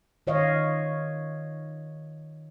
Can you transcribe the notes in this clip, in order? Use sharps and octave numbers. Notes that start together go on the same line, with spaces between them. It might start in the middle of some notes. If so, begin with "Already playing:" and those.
D#3 C#5 D#5 F5